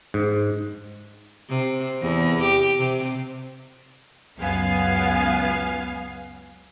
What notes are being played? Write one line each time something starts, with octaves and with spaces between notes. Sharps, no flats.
G#2
C3
E2
G4
C3
C#2 F#2 B3 F5 G#5